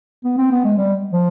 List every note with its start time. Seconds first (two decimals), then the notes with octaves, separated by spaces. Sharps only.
0.25 B3
0.38 C4
0.52 B3
0.65 G#3
0.78 G3
1.13 F3